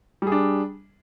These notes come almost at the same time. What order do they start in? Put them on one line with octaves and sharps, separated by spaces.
G3 G#4 D4